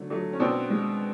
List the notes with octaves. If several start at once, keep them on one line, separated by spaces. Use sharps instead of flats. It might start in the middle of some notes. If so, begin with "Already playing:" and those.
Already playing: D3 F#3 A3
F#3 A3
C#4
B2 C4 D4
G#3